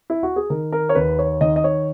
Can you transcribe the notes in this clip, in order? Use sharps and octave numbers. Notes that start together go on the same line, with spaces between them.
E4
F#4
G#4
D#3 A#4
A#4
C#5
D#2 B4
C#5
D#3 D#5
D#5
C#5